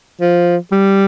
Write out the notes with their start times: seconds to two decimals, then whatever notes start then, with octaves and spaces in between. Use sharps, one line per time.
0.21 F3
0.72 G3